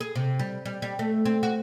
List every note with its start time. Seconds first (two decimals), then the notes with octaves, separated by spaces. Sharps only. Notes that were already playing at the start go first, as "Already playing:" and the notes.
0.01 G#4
0.16 C3
0.39 G3
0.66 G3
0.82 G3
0.99 A3
1.25 C4
1.43 F#4